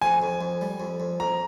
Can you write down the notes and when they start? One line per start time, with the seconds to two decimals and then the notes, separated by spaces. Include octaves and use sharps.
0.02 F2 G#5
0.22 F2
0.41 F2
0.61 G3
0.80 F2
1.00 F2
1.20 F2 A#5